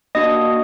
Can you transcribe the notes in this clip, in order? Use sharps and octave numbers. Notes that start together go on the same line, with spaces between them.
A#3 D4 F#4 D#5 D#6